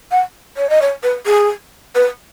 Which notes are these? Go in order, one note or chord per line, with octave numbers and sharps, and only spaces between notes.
F#5
C#5
D#5
C#5
B4
G#4
B4